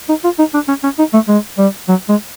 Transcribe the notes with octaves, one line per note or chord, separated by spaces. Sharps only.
D#4
F4
D#4
D4
C#4
C#4
D#4
A3
G#3
G3
F#3
G#3